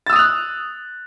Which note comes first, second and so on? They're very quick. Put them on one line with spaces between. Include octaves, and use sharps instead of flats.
A6 E6 D#6 F7 F#6